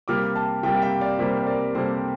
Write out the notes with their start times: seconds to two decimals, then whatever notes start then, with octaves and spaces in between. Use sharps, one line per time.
0.08 C3 G3 A#3 D6 F6
0.35 F5 A5
0.63 C3 G3 A#3 E5 G5
0.74 F5
0.82 E5 G5
1.01 D5 F5
1.19 C3 G3 A#3 C5 E5
1.37 C5
1.47 A#4 D5
1.75 C3 G3 A#3 A4 C5